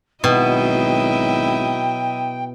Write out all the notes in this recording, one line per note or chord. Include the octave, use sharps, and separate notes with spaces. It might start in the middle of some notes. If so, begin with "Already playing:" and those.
G#1 B2 F#3 E4 D#5 G5